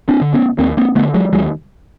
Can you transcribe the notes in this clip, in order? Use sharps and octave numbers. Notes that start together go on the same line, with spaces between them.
C4 D4
D3
B3 C#4
D#2 A#3 C4
A#3 C4
D3 A3 B3
F#3 G#3
D#2 F#3 G#3